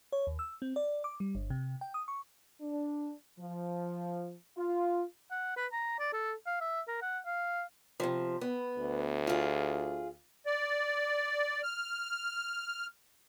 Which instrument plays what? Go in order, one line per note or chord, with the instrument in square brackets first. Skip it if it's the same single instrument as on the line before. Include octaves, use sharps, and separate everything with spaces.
[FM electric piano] C#5
D#2
E6
C4
D5
D6
G3
G1
C3
G5
D#6
C#6
[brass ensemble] D4
F3
F4
[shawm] F#5
B4
A#5
D5
A4
F5
E5
A#4
F#5
F5
[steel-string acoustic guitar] C3 F3
B3
[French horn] D2
[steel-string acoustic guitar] F4 G#4
[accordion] D5
F6